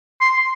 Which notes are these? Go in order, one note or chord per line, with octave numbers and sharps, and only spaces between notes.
C6